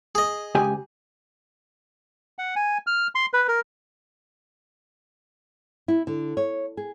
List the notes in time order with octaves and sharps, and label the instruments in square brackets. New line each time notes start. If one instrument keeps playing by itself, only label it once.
[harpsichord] G#4 D#5
[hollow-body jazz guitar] C#2 G4 G#5
[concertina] F#5
G#5
F6
C6
B4
A#4
[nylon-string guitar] E4
D3
C#5
G#4